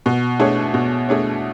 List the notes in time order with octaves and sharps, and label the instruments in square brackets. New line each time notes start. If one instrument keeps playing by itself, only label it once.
[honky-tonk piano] B2
A3 D4 G#4 C#5
B2
A3 D4 G#4 C#5